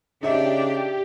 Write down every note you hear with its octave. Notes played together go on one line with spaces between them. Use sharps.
C#3 D4 D#4 G4 E5